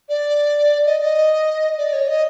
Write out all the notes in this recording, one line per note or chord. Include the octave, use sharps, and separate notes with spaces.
D5
D#5
D#5
D5
C#5
D#5